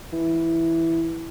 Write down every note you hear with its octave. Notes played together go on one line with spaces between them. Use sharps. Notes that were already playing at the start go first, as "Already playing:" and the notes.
E3